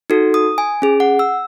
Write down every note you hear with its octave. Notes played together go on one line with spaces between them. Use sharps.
D#4 F#4 A4
D#6
G#5
C#4 G#4
F#5
E6